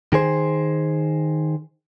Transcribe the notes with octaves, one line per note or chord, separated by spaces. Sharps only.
D#3 G#4 C5